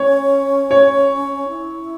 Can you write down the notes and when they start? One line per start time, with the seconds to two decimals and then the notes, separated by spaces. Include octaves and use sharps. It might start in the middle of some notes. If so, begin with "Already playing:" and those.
Already playing: C#4 C#5
0.71 C#5
1.48 E4